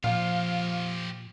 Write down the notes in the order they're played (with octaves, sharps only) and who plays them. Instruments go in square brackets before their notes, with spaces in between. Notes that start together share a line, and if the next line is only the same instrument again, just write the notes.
[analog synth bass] A#2 [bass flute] F3 [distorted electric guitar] F4 G4 [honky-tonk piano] F5